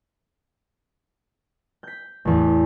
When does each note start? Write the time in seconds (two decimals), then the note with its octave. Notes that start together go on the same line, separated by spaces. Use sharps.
1.83 G6 B6
2.25 A1 E2